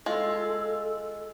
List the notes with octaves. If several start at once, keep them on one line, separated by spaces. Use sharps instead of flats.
G#3 F4 A4